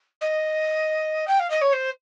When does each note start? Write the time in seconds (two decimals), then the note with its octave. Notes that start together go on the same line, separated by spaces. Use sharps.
0.21 D#5
1.27 G5
1.39 F5
1.50 D#5
1.61 C#5
1.73 C5